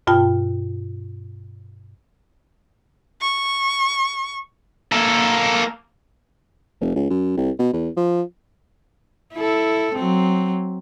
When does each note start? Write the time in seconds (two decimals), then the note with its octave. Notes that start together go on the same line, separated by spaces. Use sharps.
0.07 G2 B2 F4 G5 A5
3.21 C#6
4.92 A#3 A4
6.81 F1
6.96 C#2
7.10 F#2
7.37 C2
7.59 B2
7.73 E2
7.97 F3
9.34 E4 A4
9.94 F#3 C4